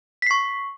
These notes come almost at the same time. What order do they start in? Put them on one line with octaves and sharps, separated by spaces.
B6 C7 C#6